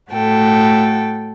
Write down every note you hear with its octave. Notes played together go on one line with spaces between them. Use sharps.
A2 A3 F#4 A4 G5